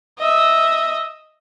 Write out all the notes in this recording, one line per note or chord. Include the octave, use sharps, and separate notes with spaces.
D#5 E5